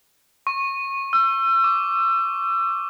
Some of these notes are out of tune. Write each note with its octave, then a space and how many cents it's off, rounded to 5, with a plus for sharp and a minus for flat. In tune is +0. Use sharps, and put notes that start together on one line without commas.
C#6 -25
E6 +35
D6 -25